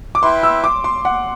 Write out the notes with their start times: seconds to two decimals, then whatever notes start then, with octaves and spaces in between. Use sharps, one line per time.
0.15 D6
0.22 E4 B4 E5 G5 C6
0.43 E6
0.64 D6
0.84 C6
1.05 F#5